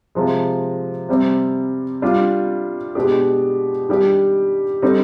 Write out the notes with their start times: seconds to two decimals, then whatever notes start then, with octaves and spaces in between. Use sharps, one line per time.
0.15 C3 F3 G#3
1.09 C3 G3 C4
2.02 G3 D4 F4
2.95 B2 G#3 D4 G4
3.89 D#3 G3 D4 G4
4.82 D3 G3 C4 D#4